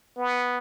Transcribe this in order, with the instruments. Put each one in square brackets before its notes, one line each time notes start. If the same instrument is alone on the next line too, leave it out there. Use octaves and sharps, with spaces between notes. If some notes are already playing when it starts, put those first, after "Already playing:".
[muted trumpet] B3